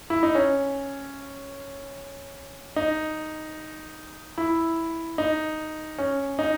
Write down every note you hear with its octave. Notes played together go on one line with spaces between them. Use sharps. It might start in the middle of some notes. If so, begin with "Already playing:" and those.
E4
D#4
C#4
D#4
E4
D#4
C#4
D#4